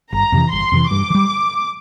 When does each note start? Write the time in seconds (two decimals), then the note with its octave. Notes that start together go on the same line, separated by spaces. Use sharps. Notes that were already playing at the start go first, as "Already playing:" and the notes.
0.13 G1 A#5
0.32 F2 C3 E3
0.52 G1 C6
0.72 F2 C3 E3
0.91 G2 D6
1.10 E3
1.15 G3